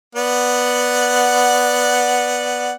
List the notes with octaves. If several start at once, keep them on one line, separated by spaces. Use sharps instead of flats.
B3 D5 F#5